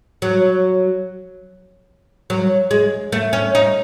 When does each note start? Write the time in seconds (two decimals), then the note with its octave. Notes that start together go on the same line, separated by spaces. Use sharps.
0.22 F#3
2.30 F#3
2.71 G#3
3.12 A3
3.33 C#4
3.55 D#4